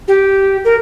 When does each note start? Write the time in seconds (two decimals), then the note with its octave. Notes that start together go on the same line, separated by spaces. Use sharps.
0.08 G4
0.65 A#4